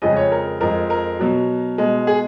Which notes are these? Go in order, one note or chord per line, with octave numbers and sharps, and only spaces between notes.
F2 C#3 F3 G#3 D#5
C#5
A#4
F2 F3 G#3 A#4
A#4
B2 F#3
B2 G#3
G#4